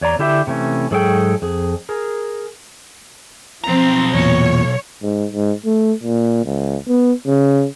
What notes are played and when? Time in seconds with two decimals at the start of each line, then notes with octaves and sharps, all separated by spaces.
0.01 E2 C#5 D5 A#5
0.19 D3 E4 G4 E5
0.47 C3 E3 A3 C#4
0.91 G#2 F#3 G#4 A4 C#5 G5
1.42 F2 G#4
1.89 G#4 A#4
3.64 B1 F3 C4 A#5
4.14 E2 A#2 C#5
5.03 G#2
5.32 G#2
5.66 A3
6.03 A#2
6.46 C#2
6.89 B3
7.27 C#3